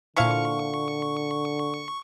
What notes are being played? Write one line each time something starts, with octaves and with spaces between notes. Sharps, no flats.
A#2 D3 F3 E4 F5 C#6 C#7